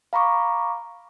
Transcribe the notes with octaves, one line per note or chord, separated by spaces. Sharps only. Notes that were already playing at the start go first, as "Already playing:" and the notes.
F5 A#5 B5 C#6 D6